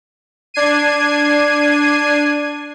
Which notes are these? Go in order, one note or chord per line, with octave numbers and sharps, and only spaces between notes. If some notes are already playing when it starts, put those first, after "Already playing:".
D4 G#6 C7 D#7